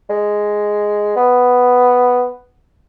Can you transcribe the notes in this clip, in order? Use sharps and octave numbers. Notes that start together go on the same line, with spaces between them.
G#3
B3